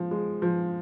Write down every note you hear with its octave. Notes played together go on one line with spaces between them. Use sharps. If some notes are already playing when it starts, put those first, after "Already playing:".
Already playing: F3 G#3
G#3
F3